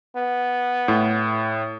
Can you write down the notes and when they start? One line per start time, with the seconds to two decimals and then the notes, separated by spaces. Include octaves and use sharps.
0.16 B3
0.88 A2